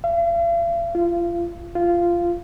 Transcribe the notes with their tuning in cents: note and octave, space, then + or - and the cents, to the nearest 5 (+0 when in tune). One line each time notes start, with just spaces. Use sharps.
F5 -45
F4 -30
F4 -15